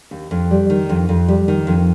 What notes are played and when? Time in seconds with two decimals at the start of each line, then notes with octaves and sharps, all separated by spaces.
0.11 D#2
0.31 F2
0.51 G3
0.70 D#3
0.89 F2
1.09 F2
1.28 G3
1.48 D#3
1.67 F2